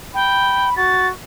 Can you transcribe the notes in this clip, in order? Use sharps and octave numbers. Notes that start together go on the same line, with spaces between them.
G5 B5
F#4 A6